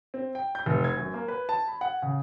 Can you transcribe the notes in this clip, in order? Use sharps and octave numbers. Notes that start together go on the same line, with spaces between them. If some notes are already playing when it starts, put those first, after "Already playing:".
C4
G5
G6
F1
G#6
F#2
A#3
B4
A5
B5
F#5
C#3